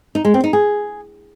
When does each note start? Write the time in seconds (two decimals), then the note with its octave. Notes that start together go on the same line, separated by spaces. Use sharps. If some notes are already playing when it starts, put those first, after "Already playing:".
0.15 D#4
0.25 G#3
0.34 C4
0.44 D#4
0.53 G#4